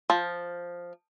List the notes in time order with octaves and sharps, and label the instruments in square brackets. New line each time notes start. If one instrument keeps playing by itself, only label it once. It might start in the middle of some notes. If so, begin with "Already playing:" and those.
[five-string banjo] F3